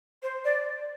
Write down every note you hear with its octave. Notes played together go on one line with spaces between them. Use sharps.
C5
D5